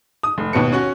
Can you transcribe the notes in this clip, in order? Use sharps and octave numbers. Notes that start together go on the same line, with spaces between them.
D#6
F1
D#2 B2 B4 A5 C#7
C#4 F#4